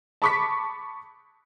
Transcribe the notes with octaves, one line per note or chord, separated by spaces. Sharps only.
A5 B5 C#6 D6 B6